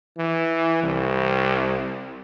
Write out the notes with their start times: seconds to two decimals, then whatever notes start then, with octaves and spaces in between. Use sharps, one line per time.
0.17 E3
0.83 C2